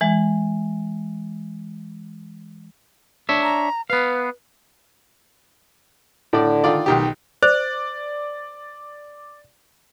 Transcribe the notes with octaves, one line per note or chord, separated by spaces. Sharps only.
E3 G#3
D4 C#5 E5
A#5
B3 B4 F5
A2 D3 D5
D#3 F4 D5
B1 D#3 G4
C5 D5